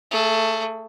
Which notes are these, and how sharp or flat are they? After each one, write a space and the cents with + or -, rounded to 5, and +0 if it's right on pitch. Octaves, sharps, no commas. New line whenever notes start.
A3 +20 G#4 +45